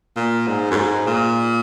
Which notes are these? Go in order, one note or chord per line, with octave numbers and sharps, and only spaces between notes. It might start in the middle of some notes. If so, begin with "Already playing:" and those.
A#2
G#2
F#2
G#2
A#2